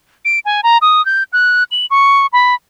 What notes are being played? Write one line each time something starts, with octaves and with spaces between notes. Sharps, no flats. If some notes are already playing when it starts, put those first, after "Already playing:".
D7
G#5
A#5
D#6
G6
F#6
F#7
C#6
B5